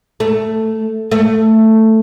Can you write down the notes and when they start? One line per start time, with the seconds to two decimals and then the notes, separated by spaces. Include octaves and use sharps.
0.20 A3
1.11 A3